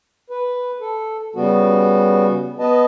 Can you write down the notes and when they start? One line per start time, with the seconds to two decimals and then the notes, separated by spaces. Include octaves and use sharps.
0.30 B4
0.80 A4
1.35 C#3 G3 B3 F#4
2.59 B3 B4 D#5 A5